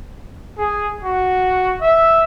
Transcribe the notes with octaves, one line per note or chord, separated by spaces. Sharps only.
G#4
F#4
E5